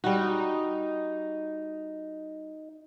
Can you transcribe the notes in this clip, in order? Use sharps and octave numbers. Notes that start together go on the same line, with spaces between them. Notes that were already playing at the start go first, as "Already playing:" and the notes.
G3 D#4 F#4